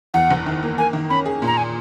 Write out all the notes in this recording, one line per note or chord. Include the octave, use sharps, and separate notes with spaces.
E2 F#5
F#1
D#3
A#3
A#3 G#5
D#3
C#4 B5
G#4
A#2
A#5
G#5